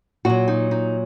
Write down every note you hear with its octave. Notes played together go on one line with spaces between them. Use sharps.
A#2 F#3 F#4
D#4
D#4